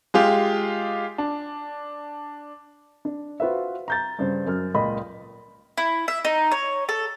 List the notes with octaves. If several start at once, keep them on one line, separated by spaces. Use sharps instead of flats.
G#3 F4 G4
D4
D4
F4 F#4 B4 C5 E5
A#5 G6 A6
G2 C#3 C5
F#2 F6
C#2 A#2 D#5 B5
E4
E5
D#4
C#5
A4